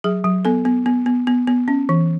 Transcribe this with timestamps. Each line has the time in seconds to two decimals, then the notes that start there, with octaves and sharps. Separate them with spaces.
0.04 F#3 G#4
0.24 F#3
0.45 B3 A4
0.65 B3
0.86 B3
1.06 B3
1.27 B3
1.47 B3
1.68 C#4
1.89 E3